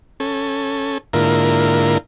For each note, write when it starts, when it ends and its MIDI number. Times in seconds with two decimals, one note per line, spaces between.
0.20 0.98 61
0.20 0.98 69
1.13 1.98 44
1.13 1.98 50
1.13 1.98 58
1.13 1.98 64
1.13 1.98 65
1.13 1.98 70